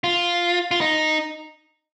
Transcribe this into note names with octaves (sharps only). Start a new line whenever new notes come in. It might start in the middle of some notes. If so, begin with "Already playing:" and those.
F4
F4
D#4